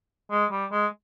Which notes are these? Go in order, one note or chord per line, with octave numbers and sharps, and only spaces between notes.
G#3
G3
G#3